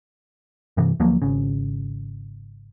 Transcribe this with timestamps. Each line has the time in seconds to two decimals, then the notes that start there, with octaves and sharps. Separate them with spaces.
0.77 G2 C3 E3
1.00 D2 F3 F#3 A#3
1.22 G#1 C#3